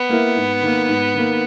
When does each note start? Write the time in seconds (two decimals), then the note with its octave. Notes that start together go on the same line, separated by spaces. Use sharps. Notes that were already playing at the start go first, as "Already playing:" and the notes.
Already playing: B3
0.10 A#3 E4 A#4
0.36 G#2
0.62 D#3 A#3
0.87 G#2
1.14 D#3 A#3